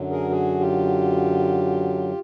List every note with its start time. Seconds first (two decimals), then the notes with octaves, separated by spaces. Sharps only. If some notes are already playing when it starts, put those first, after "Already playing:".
Already playing: F#2 D3 F#3
0.11 G#4 A#4
0.30 F#4 G#4
0.60 F4 G4